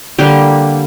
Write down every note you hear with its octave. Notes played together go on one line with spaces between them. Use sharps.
D3 G3 A#3 G4